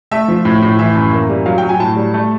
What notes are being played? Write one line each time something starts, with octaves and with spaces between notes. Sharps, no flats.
A3 E5
F3
A2
A2
E3 E5
F#2
A#3
G3
F#3 F5
F#3 G5
G#5
A2 A5
G3
A3